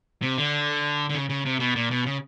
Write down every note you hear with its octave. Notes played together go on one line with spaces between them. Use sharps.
C3
D3
D3
C#3
C#3
C3
B2
A#2
B2
C#3